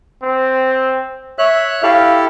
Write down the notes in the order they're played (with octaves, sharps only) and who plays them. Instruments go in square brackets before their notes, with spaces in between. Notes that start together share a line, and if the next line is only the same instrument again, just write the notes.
[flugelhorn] C4
[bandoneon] C#5 F#6 [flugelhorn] E5
[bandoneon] E4 G4 A4 [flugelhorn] F5